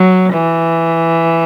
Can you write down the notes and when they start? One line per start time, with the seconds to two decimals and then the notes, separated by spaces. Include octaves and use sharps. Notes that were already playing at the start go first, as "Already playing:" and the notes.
Already playing: F#3
0.33 E3